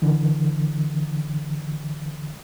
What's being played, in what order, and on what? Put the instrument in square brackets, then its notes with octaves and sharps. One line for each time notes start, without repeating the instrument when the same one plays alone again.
[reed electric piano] D3 E3